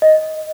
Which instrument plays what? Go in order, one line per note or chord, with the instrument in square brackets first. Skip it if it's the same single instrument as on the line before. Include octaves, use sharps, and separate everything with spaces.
[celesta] D#5